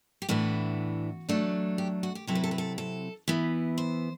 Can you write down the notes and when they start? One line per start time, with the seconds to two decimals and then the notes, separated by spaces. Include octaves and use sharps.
0.22 G4
0.29 A2 E3 B3 D4 F#4
1.29 F#3 A3 D4
1.78 G4
2.03 F#4
2.15 G4
2.27 C3 F#3 C4 E4 A4
2.35 B4
2.44 A4
2.51 B4
2.58 A4
2.78 A4
3.28 E3 B3 E4
3.78 C5